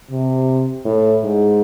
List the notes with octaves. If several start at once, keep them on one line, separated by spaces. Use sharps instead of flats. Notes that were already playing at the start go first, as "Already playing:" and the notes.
C3
A2
G#2